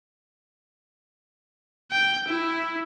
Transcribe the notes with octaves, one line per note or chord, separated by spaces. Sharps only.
G5
E4